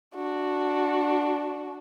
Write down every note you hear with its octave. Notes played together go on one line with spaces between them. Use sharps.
D4 F#4